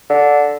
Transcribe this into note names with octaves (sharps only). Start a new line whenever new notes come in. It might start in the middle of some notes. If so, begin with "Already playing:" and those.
D3